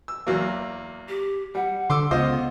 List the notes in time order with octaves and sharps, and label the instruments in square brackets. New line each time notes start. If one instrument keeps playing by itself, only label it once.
[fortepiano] E6
E2 F#3 A#3
[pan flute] G4
[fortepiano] G3 [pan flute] F#5
[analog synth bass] D3 [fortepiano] C6 D6 E6
[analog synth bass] C#2 [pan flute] B3 [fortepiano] F4 C5 D#5